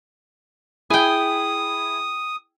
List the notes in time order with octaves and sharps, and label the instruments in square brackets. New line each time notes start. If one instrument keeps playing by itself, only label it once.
[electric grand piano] E4 G#4 B5 [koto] G5 G#5 [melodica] D#6